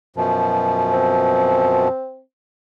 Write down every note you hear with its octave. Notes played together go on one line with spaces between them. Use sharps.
F#2 B2 F3
C4